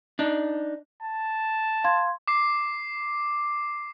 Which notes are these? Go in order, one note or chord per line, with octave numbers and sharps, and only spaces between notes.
D4 D#4
A5
F5 C6 G#6
D6 C7